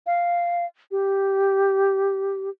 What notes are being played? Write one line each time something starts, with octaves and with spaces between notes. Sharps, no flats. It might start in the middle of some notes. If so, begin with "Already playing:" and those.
F5
G4